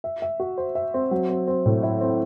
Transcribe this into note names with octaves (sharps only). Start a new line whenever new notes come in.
E5
E5
F#4
C5
E5
C4
F#3
C4
C4
A2
E4
C4